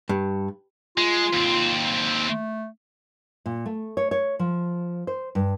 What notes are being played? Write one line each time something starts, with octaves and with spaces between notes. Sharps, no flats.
G2
G#3 F4
D#2 C4
A3
A#2
A3
C#5
C#5
F3
C5
G2